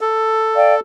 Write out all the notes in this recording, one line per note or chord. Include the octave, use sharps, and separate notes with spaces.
A4
D5 F5 G5